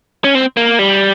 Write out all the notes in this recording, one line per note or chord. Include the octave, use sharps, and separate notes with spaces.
C#4
C4
A#3
G3